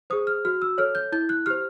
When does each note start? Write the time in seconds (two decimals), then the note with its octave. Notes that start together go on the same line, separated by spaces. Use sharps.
0.10 G#4 C5 D#6
0.27 F6
0.45 F#4 F6
0.62 E6
0.78 A4 C#5 F6
0.95 G6
1.12 E4 G6
1.29 F#6
1.46 G4 C5 F6